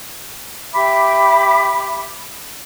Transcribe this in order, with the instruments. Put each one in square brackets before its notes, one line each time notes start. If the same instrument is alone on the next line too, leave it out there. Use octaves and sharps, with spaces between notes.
[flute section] G4 E5 B5 D6